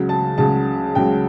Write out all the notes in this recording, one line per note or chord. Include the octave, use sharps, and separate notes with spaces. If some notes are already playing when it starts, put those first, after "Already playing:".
Already playing: C#2 C#3 F#3
A5
C#2 C#3 F#3 A5
C#2 C#3 F#3 G5